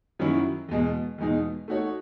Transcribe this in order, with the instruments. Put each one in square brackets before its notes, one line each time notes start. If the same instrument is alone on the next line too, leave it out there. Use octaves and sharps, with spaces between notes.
[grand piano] F#2 D#3 F#3 C#4 E4
E2 B2 G#3
E2 B2 G#3 D#4
A3 D#4 F#4 C#5